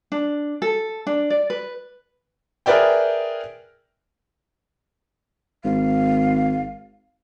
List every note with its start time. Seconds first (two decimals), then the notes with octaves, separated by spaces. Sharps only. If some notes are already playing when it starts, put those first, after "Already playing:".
0.12 D4
0.62 A4
1.07 D4
1.30 D5
1.50 B4
2.66 G#4 A#4 B4 D5 E5 G5
5.65 G#1 F5